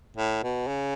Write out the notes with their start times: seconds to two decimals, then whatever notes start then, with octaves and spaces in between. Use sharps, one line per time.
0.17 A2
0.43 B2
0.67 C#3